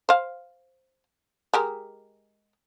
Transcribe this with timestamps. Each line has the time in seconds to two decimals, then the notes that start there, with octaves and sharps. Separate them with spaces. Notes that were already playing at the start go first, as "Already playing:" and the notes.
0.09 C5 F5
1.54 G#3 G4 A#4